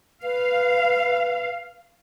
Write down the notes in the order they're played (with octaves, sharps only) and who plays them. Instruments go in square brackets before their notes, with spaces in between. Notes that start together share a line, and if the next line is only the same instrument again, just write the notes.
[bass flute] B4 [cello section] F5